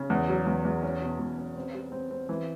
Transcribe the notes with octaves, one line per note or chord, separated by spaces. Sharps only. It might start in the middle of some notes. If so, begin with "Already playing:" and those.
Already playing: C#3
E2
F#3
E2
E2
C#4
B2
E2
C#4
C4
G3
C4
C4
E3